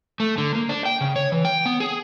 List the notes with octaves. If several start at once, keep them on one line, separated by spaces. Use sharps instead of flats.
A3
D3
A#3
D4
G5
C#3
C#5
E3
G5
B3
G#4